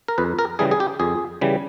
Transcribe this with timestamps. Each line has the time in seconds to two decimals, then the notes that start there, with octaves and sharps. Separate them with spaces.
0.08 A#4
0.18 F2 B4
0.39 A#4
0.59 C#3 E3 G3 G#4
0.71 G#4
0.80 G4
1.00 F2 G#4
1.41 C#3 E3 G3